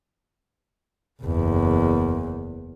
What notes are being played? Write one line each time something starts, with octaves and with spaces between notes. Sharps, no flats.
F#1 E2